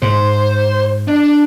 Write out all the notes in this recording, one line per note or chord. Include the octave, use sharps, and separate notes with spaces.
G#2 C5
D4